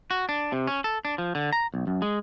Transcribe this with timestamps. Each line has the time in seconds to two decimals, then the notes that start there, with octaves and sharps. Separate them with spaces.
0.11 F#4
0.29 D4
0.52 C3
0.67 C#4
0.84 A4
1.05 D4
1.18 F3
1.35 D3
1.53 A#5
1.74 B1
1.87 F#2
2.02 G#3